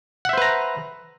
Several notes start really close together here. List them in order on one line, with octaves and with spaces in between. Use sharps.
F#5 E5 C5 B4 A#5